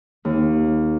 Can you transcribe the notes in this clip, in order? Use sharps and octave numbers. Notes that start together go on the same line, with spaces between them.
D#2